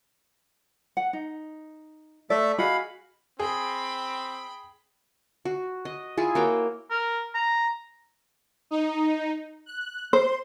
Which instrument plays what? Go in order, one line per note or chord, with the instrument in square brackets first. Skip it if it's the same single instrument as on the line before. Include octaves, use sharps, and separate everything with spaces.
[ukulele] F#5
D#4
[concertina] A3 A4 E5 [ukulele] D5
[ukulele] F#4 G#4 D#5 [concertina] F5 B5
[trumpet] C4 [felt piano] G#4 [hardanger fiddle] G5 B5
[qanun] F#4
D#5
E4 F4 G#4
A#3 F#4 C#5 G5
[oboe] A#4
A#5
[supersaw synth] D#4
F#6
[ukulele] C5 [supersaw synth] C6